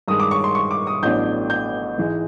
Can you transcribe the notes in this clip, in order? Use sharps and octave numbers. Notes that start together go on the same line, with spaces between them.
G2 D#3 G#3 D#6
D6
C#6
C6
C#6
D6
D#6
A1 A2 F#3 B3 D4 G6
G6
G#2 E3 G#3